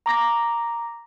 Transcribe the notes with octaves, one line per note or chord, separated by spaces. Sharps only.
A#5 D6 A#6